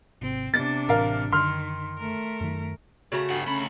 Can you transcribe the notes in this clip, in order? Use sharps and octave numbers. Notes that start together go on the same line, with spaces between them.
G#1 C3 C4
C3 B3 D4 A6
A1 A2 E3 A#4 F5
F#2 D3 D#3 C6 F6
A3 A#4
F#2 D#3
C#3 A3 F#4 A#5
G2 F#5
D2 C#4 B5